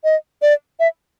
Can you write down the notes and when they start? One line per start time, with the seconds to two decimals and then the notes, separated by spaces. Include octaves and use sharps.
0.04 D#5
0.42 D5
0.80 E5